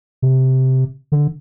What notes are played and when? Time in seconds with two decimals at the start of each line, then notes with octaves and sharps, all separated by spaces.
0.22 C3
1.12 D3